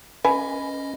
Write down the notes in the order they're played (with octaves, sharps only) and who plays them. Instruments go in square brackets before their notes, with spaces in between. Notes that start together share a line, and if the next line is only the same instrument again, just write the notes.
[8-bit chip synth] C#4 D#5 [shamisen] B4 G#5